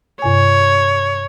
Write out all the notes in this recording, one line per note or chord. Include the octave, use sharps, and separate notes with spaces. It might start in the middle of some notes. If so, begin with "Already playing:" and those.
G2 C3 C#5 G#5